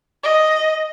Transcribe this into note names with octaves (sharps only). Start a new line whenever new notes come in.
D#5